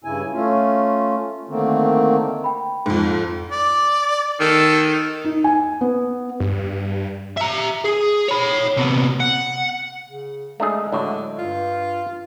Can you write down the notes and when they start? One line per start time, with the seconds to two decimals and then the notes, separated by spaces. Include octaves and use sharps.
0.04 G2 C#3 E4 G#5
0.33 A3 C#4 F4
1.49 D3 D#3 A3 A#3 C4
2.44 G5 B5
2.86 F2 G#2
3.51 D5
4.40 D#3 A4
5.25 D#4
5.44 G#5
5.81 B3
6.40 G2
7.37 E5 A#5
7.85 G#4
8.28 C#5 B5
8.77 C3 B3
9.20 F#5
10.10 C#3
10.60 G#3 A3 D4 G#4
10.92 A2 D3 F#3 A3
11.38 G2 F4